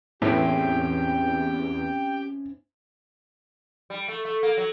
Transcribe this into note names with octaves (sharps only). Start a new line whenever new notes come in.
E2 A2 C4 C#4 G4 G5
G3
A3
A3
A#3
F#3